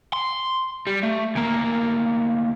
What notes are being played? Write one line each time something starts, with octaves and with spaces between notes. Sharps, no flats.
C6
G3
A3
D2 A#3